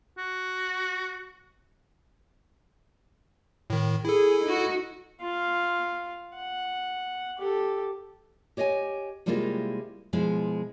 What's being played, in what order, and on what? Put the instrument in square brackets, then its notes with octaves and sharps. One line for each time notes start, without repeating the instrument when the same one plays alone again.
[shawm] F#4
[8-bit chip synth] A2 D#3
[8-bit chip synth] E4 A4 [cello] G#4
[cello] D#4 F#4
[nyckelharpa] F4 F5
F#5
G4 A4
[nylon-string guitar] G4 C#5 D#5 F5 G#5
C3 G3 G#3 A#3 E4 F4
B2 F3 G#3 E4